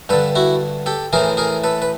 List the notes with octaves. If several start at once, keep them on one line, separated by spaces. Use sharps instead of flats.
G2 D3 A4 B4
E4 F#4
G4 A4
A2 E3 G#4 A#4
G#4 A#4
A4 B4
B4